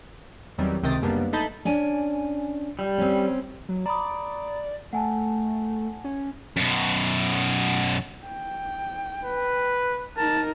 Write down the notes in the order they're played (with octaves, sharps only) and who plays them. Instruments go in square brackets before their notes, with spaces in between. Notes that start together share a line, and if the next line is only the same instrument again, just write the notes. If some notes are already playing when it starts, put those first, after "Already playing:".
[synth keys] E2 D#3 F#3 G3 C4
C#2 C3 D#3 G5 D#6 A6
F#2 C#3 G3 A#3 B3 D4
A3 D#4 A5 B5 G6
[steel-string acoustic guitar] C#4 D4 G#5
[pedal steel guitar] G3
[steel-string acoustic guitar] C4 C#4
[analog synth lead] F#3
[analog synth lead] D5 [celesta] A#5 B5 D#6
[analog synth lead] A3 [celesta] F#5 G#5 A5
[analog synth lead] C#4
[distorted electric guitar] F#2 B2
[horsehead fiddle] G5
[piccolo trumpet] B4
[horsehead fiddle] D#4 A#4 [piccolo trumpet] A5